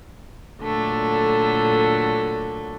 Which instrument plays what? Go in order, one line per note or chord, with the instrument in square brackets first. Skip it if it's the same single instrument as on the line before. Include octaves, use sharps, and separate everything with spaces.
[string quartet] A#2 D3 F#3 A3